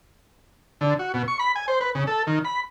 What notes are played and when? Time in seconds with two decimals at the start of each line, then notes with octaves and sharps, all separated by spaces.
0.81 D3
0.99 F#4
1.14 B2
1.28 C#6
1.39 B5
1.56 G#5
1.68 C5
1.81 B4
1.95 C#3
2.07 A4
2.27 D#3
2.45 B5